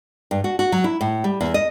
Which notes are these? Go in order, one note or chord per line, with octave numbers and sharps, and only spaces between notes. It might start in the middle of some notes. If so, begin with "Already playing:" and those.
G2
F#4
F#4
F#3
E4
A2
G3
E2
D#5